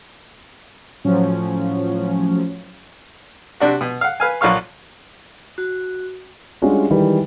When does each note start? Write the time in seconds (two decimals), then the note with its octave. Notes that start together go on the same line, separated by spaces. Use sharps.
1.05 A2 F3 F#3 C#4
3.60 C3 D4 F#4
3.81 B2
4.01 F5 F#5
4.20 B4 F5 G#5
4.41 A#1 F#3 F4 F5 C#6
5.58 F#4
6.62 G3 G#3 C#4 D4 F4 F#4
6.91 D#3 E3 G3 G#3